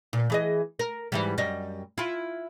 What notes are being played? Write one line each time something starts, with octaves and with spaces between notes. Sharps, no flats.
A#2
E3 G#4 D#5
A#4
G#2 E3 G3
F#2 G3 D#5
E4 F4